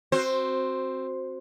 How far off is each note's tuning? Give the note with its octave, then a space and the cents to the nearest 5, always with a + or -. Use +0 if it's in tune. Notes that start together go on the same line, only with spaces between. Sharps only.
C4 +15 F#4 +0 C5 +0